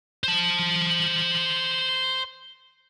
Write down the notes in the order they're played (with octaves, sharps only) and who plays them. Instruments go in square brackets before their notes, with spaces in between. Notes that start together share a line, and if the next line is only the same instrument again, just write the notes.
[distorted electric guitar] C5 A5